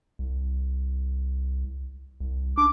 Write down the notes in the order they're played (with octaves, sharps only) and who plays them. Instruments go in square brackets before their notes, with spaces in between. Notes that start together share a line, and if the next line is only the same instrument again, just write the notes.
[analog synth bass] C2
C2
[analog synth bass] D4 [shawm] D6